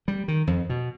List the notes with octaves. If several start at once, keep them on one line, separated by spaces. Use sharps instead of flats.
G3
D#3
F2
B2